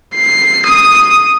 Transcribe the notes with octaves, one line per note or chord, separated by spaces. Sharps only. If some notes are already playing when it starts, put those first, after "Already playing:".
C7
D#6